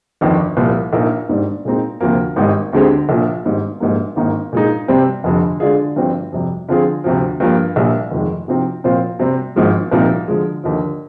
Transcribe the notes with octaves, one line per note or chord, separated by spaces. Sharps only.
G1 F2 D#3
C2 A#2 F3
A#1 A#2 F3 A#3 D#4
G#1 G#2 D#3 G3 D4
A#2 G#3 C4 D#4
D2 C3 F3 A#3
G#1 G#2 D#3 G3
D2 D3 G#3 C4 G4
A#1 A#2 F3
G#1 G#2 G3
A#1 G#2 G3 A#3
G#1 G#2 D#3 A#3 D#4
A#2 G#3 D#4
C3 G3 C4
F1 F2 D3
D3 G#3 D4 F4 G#4
G1 G2 F3 C4 G4
F2 C3 G3
D3 F3 C4 F4 G#4
D2 C3 F3
G2 F3 A#3
A#1 A#2 G3
F1 F2 D#3 G#3
C3 F3 C4 D#4 G4
A#2 F3 C4 F4 C5
C3 G3 C4
G#1 G#2 F3 G#3
C2 A#2 F3 C4 D#4
D3 F3 G#3
D#2 D3 F3